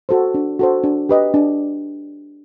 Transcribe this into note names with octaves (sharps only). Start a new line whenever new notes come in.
F#4 A4 C5
D4
F#4 A4 C5
D4
G4 B4 D#5
D4